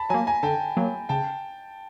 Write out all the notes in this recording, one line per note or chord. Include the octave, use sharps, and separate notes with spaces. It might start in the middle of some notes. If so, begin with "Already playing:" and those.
Already playing: A5 B5
F#3 A#3 G#5 A#5
G#5 A#5
D3 G5 A5
F#3 A#3
C#3 G5 A5